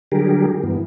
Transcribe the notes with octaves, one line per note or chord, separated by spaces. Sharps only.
D3 F#3 G3 G4 G#4 A#4
G2 E3 B3